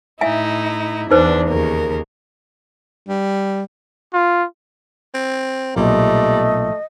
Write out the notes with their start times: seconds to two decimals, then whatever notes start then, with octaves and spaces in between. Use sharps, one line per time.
0.21 A2 D#4 E4 E5 F5 G#5
1.11 E2 D4 D#4 B4 C5
1.50 D#2 C#3 A#4
3.08 G3
4.13 F4
5.15 C4
5.76 B1 A#2 G3 A3 D#5